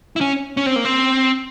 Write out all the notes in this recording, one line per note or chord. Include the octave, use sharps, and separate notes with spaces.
E4
C#4
C#4
C4
A#3
C4